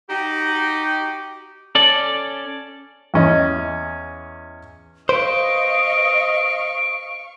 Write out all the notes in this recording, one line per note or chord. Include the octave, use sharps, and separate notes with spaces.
D#4 F#4 G4
C#4 A4 D5
E2 C#4 D#5
B4 C5 D#5 F5 C#6 D7